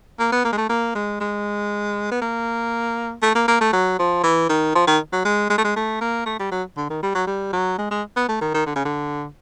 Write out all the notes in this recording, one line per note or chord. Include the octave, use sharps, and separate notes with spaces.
A#3
B3
A#3
G#3
A3
A#3
G#3
G#3
B3
A#3
A3
A#3
A#3
A3
F#3
F3
E3
D#3
F3
D#3
F#3
G#3
G#3
A3
G#3
A3
A#3
A3
G3
F#3
D3
D#3
G3
F#3
G3
F#3
G#3
G#3
B3
A3
D#3
D#3
D3
C#3
D3